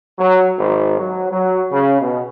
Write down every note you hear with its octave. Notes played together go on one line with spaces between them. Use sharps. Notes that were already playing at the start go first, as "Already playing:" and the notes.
F#3
G#1
F#3
F#3
C#3
B2